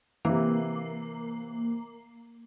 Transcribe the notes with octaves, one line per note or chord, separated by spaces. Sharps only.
C3 E3 A#3